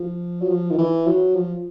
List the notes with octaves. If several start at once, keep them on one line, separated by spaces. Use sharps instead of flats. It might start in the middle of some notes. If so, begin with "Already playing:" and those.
Already playing: F3
F#3
F3
D#3
E3
F#3
F3